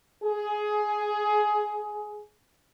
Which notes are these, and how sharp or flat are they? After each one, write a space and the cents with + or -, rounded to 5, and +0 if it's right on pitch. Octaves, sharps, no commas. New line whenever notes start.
G#4 +15